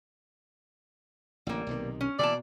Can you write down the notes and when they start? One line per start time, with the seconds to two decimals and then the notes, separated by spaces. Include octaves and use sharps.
1.47 A1 D3 G3 A#3
1.67 B1 C3 D#3
2.01 C#4
2.19 B2 E3 A#3 D5 A5